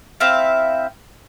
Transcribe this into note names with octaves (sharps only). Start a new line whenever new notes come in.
C4 E4 E5 F5